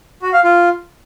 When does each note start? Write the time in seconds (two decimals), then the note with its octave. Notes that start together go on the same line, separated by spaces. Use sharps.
0.22 F#4
0.33 F5
0.44 F4